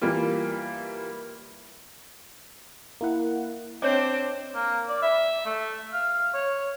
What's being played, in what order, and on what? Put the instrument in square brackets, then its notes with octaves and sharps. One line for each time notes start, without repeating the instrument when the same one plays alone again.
[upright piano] E3 G3 A#3 F4
[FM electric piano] A#3 E4 F#5
[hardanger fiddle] C4 D4 [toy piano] C5 C#5 D#5 [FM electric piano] D6 G6
[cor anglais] A#3
D5
E5
A3
F5
C#5